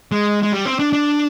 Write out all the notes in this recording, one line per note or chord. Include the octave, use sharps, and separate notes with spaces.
G#3
G#3
G3
C4
D4
D4